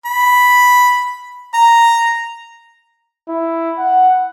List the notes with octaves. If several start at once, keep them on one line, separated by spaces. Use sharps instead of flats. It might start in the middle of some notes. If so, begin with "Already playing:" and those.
B5
A#5
E4
F#5